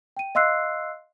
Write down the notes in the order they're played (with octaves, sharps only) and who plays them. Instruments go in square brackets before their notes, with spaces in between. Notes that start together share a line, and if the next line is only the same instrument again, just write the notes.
[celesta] G5 D#7
D#5 F5 C6 E6 F#6 C7